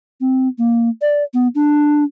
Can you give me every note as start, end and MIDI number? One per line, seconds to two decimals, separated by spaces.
0.21 0.48 60
0.58 0.89 58
1.02 1.24 74
1.34 1.48 59
1.55 2.04 62